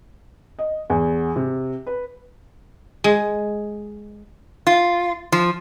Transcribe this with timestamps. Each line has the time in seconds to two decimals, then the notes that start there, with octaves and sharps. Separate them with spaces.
0.59 D#5
0.90 E2
1.36 C3
1.87 B4
3.04 G#3
4.67 F4
5.32 F3